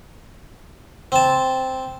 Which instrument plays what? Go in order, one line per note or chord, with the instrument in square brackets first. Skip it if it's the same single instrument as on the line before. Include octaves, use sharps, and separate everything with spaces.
[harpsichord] C4 A5